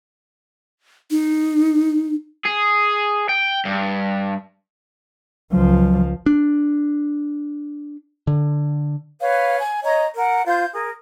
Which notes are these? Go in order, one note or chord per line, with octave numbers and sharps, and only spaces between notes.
D#4
G#4
G5
G2
C#2 F3 F#3
D4
D3
B4 C#5 F5
G#5
C#5 D#5 A#5
A#4 F#5
F4 C5 G6
G#4 A#4